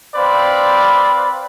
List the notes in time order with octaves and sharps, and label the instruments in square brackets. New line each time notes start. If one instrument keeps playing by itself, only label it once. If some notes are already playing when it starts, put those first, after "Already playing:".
[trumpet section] C4 B4 C5 D5 F5 B5